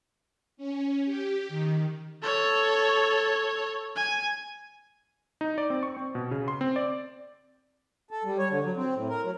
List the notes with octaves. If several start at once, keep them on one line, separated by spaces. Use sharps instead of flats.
C#4
G4
D#3
A4 C#5
G#5
D#4
D5
C4
C#6
C4
B2
C#3
C6
C4
D5
A4
G3
C#5
D3
F#3
C4
A2
A#4
F#3